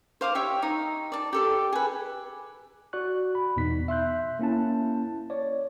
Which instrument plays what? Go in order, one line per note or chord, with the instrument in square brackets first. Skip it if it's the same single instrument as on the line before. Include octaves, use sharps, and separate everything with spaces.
[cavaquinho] C5 F5 D6 D#6
G4 C#5 E5 G5
D#4 D#6
D5 A5
G4 A4 D5
G#4 B4
[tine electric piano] F#4 D5 C#6 F#6
B5
E2 B2 B3 D#4 B6
E5 C6 F#6 G6
A#3 C#4 E4 A5
C#5 D5